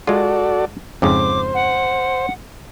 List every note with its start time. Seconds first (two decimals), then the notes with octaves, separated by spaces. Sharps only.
0.07 G#3 F4 F#4 A4 D5
1.02 F2 G#2 C#3 C5 D6
1.54 F#5